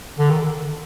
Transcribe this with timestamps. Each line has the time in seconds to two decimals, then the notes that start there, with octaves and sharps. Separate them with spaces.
0.18 D3
0.30 D#3